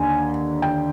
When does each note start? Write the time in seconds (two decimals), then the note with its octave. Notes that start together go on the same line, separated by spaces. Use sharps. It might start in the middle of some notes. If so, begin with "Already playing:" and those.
Already playing: D#2 D3 G#5
0.62 G5